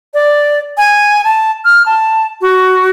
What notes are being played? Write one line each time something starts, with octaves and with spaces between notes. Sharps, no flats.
D5
G#5
A5
F6
A5
F#4